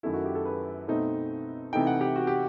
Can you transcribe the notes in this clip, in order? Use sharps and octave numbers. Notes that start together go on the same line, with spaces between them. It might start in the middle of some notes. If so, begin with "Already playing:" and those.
F#2 D#3 A3 E4
F#4
G4
A4
B4
B2 A3 C4 D#4
C3 E3 A3 D#4 G5
F#5
G4
F#4
G4